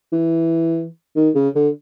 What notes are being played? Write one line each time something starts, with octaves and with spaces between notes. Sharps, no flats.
E3
D#3
C#3
D3